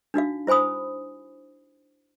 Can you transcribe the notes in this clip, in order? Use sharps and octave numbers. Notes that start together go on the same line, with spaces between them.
D4 D#4 F#4 F5
E4 C5 G#5 B5 D#6